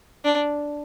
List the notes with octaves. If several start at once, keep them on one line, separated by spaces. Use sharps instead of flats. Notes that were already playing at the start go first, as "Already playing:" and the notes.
D4